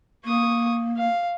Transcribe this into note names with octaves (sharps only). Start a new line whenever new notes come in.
A#3 C#6 D#6
F5